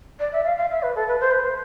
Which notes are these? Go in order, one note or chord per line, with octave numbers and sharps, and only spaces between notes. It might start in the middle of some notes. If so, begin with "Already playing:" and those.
D5
E5
F5
F5
E5
B4
A4
B4
C5
B4
C5